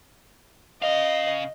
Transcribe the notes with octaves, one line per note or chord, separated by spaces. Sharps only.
C#3 D#5 F5